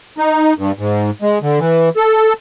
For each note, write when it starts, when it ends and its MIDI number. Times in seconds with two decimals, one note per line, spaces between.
0.18 0.53 63
0.58 0.71 43
0.79 1.10 44
1.22 1.39 56
1.42 1.59 50
1.59 1.89 52
1.96 2.33 69